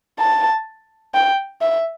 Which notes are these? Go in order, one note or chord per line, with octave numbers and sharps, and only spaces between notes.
A5
G5
E5